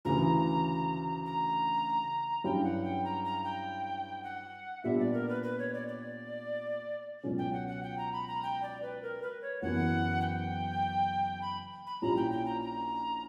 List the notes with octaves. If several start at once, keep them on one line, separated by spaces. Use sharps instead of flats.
D2 C#3 E3 A#5
A#5
G2 F#3 C#4 E4 G5
F#5
G5
A#5
A#5
G5
F#5
A#2 G3 B3 D4 E5
D5
A#4
B4
B4
C#5
D5
D5
C#2 B2 F#3 C#4
G5
F#5
F#5
G5
A#5
B5
A#5
G5
D5
B4
A#4
B4
C#5
F#1 F#2 E3 B3 F#5
G5
B5
B5
A#1 A#2 G3 C#4 E4 A#5
G5
G5
A#5
A#5